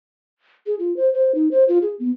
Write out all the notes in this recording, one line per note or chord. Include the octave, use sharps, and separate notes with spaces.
G#4
F4
C5
C5
D#4
C5
F4
G#4
B3